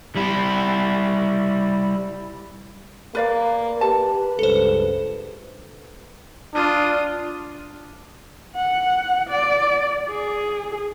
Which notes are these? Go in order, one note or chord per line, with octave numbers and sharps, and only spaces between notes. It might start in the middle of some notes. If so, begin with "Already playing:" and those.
G3 E4
A#3 B4 D5 F5
G4 B4 A5
C#2 G2 A4 C5
D4 F4 D#6
F#5
D5
G#4